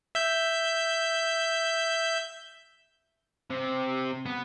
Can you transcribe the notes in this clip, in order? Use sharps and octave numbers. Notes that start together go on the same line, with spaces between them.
E5 G6
C3
B3